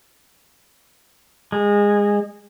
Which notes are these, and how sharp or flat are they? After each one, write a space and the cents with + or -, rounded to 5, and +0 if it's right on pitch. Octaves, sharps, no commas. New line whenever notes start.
G#3 -20